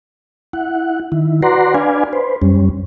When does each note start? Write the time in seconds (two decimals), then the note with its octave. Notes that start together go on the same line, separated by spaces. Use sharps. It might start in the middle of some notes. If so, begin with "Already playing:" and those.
0.53 E4 F#5
1.12 D#3 E4
1.42 F#4 B4 D5 F#5 A#5 C6
1.74 D4 B4 D5 F5 G#5
2.13 B4 C5
2.42 F#2 G3 C#4